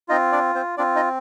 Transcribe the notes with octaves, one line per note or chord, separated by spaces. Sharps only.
C4 D#4 F4 D#5
D4 D5
C4 C5
C4 D4 F4 D5
D#4 D#5